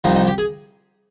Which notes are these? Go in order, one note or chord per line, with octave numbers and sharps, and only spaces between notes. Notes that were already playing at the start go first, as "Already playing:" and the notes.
C2 C3 F3 D#4
D#4
G4
G#4